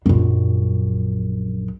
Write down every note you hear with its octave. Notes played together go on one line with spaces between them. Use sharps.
A#1 F#2